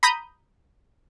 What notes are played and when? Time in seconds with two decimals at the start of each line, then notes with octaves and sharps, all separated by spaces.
0.03 A#5 B5 D#6 G6